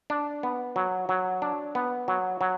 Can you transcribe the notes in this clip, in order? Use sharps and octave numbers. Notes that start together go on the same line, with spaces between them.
D4
B3
F#3
F#3
D4
B3
F#3
F#3